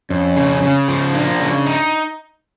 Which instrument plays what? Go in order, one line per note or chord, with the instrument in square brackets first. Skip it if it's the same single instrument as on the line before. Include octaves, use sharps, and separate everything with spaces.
[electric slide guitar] F2 [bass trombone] C#4
[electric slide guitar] C#3
C#3
F3
[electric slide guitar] A#3 [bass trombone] D4
[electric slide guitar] C#3
D#4